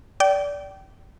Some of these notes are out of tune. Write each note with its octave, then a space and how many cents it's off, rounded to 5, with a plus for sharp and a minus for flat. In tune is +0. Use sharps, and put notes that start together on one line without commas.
D5 -20 G5 -25